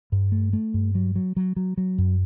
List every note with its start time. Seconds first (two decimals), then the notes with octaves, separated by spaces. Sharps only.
0.12 G2
0.32 A3
0.53 A3
0.74 G2
0.95 F#3
1.16 F#3
1.37 F#3
1.57 F#3
1.78 F#3
1.98 F#2